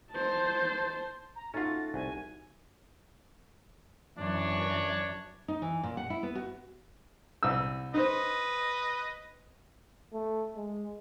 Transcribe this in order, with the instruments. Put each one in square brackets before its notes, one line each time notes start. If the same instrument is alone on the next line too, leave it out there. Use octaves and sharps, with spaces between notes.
[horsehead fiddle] C5 A5
[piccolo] A#5
[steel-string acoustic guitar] A3 F#4 [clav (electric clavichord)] C#4 F4 [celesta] D#4 [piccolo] A6
[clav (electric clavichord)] C2 [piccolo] G#5
[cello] F#2 E3 [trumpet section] D4 C#5
[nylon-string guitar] D#4
E3
A#2
F#5
E4
B3
F#4
[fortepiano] C2 E6
[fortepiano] D#4 C5 [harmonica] B4 D#5
[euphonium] A3
G#3